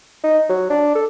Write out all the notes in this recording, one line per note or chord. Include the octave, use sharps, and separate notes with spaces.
D#4
F#3
D4
A4